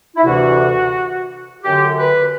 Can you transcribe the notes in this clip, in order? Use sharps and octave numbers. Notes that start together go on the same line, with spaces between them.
E4
D2 C3 E3 F#4
F#2 D3 G4
B4